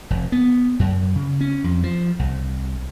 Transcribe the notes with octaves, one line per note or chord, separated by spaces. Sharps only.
F1
B3
F#2
C#3
C#4
F2
F3
C2